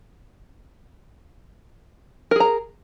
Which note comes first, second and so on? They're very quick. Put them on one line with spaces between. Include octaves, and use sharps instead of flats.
A#4 G#4 A#5